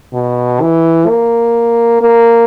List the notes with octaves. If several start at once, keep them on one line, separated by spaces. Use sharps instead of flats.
B2
E3
A#3
A#3